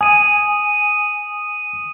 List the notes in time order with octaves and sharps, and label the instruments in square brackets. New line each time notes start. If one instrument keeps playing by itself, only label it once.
[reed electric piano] G#5 [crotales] D#6 D#7